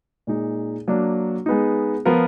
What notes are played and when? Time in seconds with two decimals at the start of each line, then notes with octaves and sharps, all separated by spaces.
0.27 A#2 G#3 D#4
0.88 F#3 A#3 D4
1.46 G#3 B3 D#4
2.05 F3 B3 F4 A#4